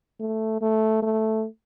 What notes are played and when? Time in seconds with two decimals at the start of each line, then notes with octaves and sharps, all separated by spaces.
0.20 A3
0.62 A3
1.02 A3